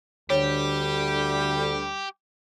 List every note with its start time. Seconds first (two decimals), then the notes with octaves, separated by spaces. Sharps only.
0.30 D2 D3 G3 G4 C#5